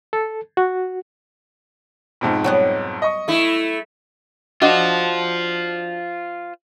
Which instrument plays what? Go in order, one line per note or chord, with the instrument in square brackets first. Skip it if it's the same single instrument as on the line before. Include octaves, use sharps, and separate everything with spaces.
[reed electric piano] A4
F#4
[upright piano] B1 F2 G#2
[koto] F#3 G3 B3
[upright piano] D#5 C#6
[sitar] A3 E4
[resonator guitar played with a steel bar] D4 F#4 D#5 [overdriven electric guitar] F4 C5